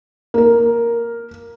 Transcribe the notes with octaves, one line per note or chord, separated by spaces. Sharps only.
A#3 A#4